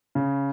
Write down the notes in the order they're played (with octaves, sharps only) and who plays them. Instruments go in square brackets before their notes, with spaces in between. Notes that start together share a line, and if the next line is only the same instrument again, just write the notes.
[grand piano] C#3